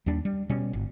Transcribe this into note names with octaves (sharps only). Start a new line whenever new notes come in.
D#2 G3 D4
G3
B2 G3 C#4
G1